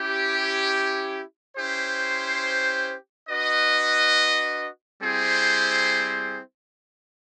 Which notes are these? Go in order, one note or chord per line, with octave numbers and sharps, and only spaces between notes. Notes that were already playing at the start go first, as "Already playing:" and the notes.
Already playing: C#4 E4 G4
C#4 E4 G4 C5
D4 F#4 B4 D#5
G3 C4 E4 G#4 C5